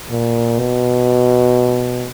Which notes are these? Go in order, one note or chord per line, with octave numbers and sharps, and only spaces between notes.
A#2
B2